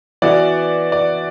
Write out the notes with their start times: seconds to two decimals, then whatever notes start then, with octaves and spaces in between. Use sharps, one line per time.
0.22 E3 B3 F#4 D5
0.92 D5